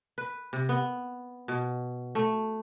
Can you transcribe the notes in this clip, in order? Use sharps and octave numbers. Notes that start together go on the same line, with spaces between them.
B4
C3
B3
B2
A3